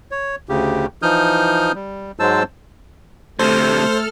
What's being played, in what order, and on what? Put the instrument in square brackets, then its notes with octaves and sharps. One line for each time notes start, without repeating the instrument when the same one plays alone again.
[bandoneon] C#5
D2 C#3 G4
E3 F3 D#4 D#6 F6 G6
G3
G#2 F#3 G#3 C5 A5 E6
[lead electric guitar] D2 C3 [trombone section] A3 [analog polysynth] A4 F6 [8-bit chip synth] C5